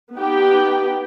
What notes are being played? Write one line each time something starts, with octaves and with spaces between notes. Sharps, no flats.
B3 D#4 G4 G5